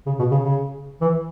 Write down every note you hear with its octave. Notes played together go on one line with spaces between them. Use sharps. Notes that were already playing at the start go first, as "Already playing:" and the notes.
C#3
B2
C#3
C#3
E3